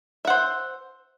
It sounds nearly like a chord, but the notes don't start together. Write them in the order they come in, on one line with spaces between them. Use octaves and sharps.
E5 F#5 C5